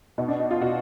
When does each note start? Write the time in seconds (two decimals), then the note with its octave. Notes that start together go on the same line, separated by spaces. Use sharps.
0.18 B2 D#4
0.28 D4
0.40 D#4
0.51 F4
0.61 B2 F#4